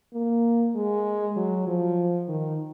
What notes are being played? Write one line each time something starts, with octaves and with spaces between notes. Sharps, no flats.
A#3
G#3
F#3
F3
D#3